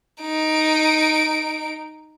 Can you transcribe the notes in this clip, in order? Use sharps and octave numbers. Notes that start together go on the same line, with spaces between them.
D#4 D7